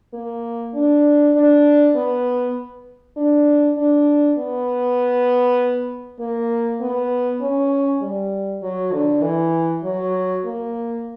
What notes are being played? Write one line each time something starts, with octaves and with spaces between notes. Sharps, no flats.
A#3
D4
D4
B3
D4
D4
B3
A#3
B3
C#4
G3
F#3
D3
E3
F#3
A#3